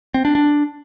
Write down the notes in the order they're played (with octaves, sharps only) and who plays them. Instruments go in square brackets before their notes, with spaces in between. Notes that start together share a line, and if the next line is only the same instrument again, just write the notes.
[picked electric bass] C4
D4
D4